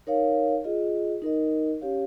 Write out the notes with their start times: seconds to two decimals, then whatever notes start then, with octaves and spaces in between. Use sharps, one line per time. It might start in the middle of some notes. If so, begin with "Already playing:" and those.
0.07 D#4 A#4 C#5 F5
0.64 F4 G#4 D#5
1.22 D#4 A#4 D#5
1.81 C#4 G4 C#5 F5